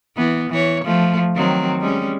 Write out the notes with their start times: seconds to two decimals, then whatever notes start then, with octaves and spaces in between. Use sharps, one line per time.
0.16 E3 B3
0.50 E3 C#5
0.84 F3 A3
1.36 D#3 F#3 C4
1.80 G3 G#3 C#4